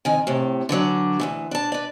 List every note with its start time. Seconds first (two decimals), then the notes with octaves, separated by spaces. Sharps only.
0.05 F2 D#3 G#5
0.27 A2 C3
0.69 D3 E3 F#3 D4
1.20 D2 C3 E3
1.51 D4 A5
1.72 B4 D5